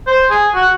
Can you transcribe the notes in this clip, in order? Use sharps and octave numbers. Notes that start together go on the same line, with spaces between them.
C5
G#4
F#4